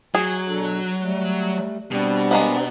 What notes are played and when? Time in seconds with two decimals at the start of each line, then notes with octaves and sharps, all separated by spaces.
0.15 F#3 G#4 G#5
0.48 B2 D4 A4
1.00 G3 A3
1.91 B2 G3 C4 D4 D5
2.31 G#3 A#3 B3